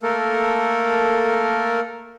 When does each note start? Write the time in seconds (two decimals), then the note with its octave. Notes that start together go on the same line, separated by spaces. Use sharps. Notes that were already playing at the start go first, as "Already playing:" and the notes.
0.03 A3 A#3 A4 A#4